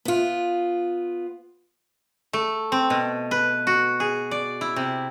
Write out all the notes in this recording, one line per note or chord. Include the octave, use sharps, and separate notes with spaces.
B3 F4
A3
C4
B2
B4
F#4
G#4
D5
E4
C3